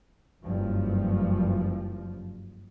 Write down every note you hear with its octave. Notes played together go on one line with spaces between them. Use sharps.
F#1 G2 F3